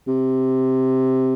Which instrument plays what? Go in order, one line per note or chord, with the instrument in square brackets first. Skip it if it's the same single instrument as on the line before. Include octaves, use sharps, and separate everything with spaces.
[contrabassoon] C3